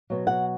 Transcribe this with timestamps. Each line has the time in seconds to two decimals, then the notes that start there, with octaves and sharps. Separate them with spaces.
0.10 B2 F#3
0.27 F#5